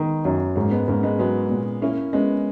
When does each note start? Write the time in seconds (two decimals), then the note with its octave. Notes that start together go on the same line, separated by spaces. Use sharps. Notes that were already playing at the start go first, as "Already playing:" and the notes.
Already playing: D#3 G#3 B3
0.25 F#2
0.56 G#2 A#3 C#4
0.71 G#3 B3
0.88 G#2 A#3 C#4
1.03 G#3 B3
1.19 F#3 G#3 B3
1.50 A#2
1.82 A#3 C#4 E4
2.13 G#3 B3 C#4